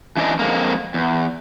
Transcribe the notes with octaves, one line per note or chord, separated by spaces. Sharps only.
E3 C#4 D4 C#5 D#5 E5
F2 G#3 A#3
E2